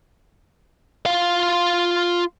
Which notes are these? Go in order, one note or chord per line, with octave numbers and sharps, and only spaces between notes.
F4 F5